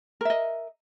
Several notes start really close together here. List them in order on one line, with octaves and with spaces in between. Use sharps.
A#4 E5 D#5